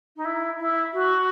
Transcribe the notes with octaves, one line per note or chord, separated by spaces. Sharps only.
D#4
E4
E4
F#4